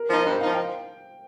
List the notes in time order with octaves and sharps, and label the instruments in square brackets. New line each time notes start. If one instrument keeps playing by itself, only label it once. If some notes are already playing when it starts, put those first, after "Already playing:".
Already playing: [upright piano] A#4
[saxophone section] F3 D#4 [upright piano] C5
[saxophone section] G2 [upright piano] C5
[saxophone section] F3 D#4 [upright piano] F5
[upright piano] G5